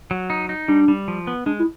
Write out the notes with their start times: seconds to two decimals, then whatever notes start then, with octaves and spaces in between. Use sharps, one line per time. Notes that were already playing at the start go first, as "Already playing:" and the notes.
0.11 F#3
0.30 D#4
0.49 D#4
0.68 G3 D4
0.88 G3
1.08 F3
1.27 B3
1.46 G#3 D4
1.59 E4